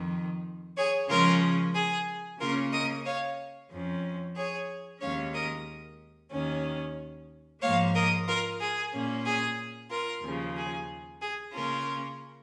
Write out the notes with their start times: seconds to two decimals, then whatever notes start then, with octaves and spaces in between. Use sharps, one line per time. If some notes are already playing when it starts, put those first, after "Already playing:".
Already playing: F2 D#3
0.77 G#4 C#5
1.09 C#3 F3 G#3 C#4 F4 A#4
1.74 G#4
2.40 C#3 A#3 C#4 F4 A#4
2.72 A#4 D#5
3.06 C#5 F5
3.71 F2 F3 C#4
4.36 G#4 C#5
5.01 D#2 D#3 G#3 C#4 C#5 F5
5.34 A#4 D#5
6.31 D#2 D#3 C#4
7.61 G#2 F3 A#3 C#5 F5
7.95 A#4 D#5
8.27 F4 A#4
8.60 G#4
8.92 A#2 A#3 C#4
9.25 G#4
9.90 F4 A#4
10.23 D#2 C#3 F3
10.56 G#4
11.21 G#4
11.53 C#3 A#3 C#4 F4 A#4